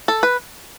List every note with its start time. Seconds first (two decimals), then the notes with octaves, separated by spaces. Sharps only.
0.08 A4
0.23 B4